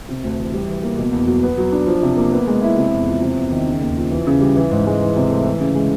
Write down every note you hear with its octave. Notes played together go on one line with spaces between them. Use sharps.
C3
D2
E3
G3
E3
A#3
B2
E2
F#3
B3
F#3
D4
F3
C3
A#3
B3
G#3
E4
C3
E2
F3
C3
E2
D#3
C#3
D#2
F3
E3
C#3
G3
E3
G#2
G#3
E3
C3
A3
E3
C#3
G#3